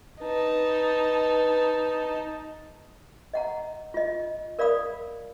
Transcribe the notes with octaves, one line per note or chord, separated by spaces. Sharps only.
D#4 B4 A5
D#5 F#5 A#5
F4 D#5
A#4 D5 F5 B5 D#6